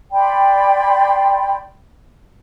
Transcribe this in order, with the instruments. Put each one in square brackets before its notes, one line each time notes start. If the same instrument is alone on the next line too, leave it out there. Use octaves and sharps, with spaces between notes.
[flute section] D5 G5 B5 C6